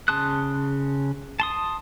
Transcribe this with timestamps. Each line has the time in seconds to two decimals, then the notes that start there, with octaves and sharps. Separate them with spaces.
0.08 C#3 A5 C6 D#6 F#6
1.40 A5 C6 D#6